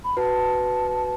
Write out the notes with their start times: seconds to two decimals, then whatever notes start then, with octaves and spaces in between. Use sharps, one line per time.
0.04 B5
0.17 F#4 B4 A5